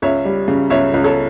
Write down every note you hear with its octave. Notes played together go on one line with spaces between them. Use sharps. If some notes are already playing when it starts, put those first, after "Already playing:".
C#2 C#5 E5
G3
C#3
C#2 C#5 E5
C#2
A4 C#5